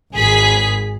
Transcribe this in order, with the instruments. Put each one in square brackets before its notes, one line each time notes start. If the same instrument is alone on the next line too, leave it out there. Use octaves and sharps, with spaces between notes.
[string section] G#1 G#4 B6